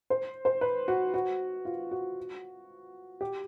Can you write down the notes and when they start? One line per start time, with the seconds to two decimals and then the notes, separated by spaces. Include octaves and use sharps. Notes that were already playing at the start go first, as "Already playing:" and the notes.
0.10 C5
0.45 C5
0.61 B4
0.88 F#4
1.14 F#4
1.65 F4
1.91 F#4
3.21 G4